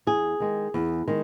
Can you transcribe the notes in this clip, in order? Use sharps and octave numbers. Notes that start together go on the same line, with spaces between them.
E2 G#4
D#3 G#3
E2
D#3 G#3